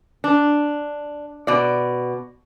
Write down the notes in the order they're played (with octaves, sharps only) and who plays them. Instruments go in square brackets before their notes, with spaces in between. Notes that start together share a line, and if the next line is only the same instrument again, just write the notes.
[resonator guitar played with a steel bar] D4
B2 D5